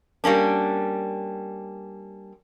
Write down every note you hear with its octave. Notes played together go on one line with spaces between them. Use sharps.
G3 A#3 C#4 D4